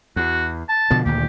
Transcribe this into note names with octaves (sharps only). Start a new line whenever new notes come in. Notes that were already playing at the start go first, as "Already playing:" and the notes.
E2 F#4
A5
B2 D3 F3
D2 A#2 D#3 G4